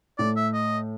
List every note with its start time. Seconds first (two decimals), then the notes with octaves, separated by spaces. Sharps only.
0.18 A2 D5
0.36 E5
0.54 D#5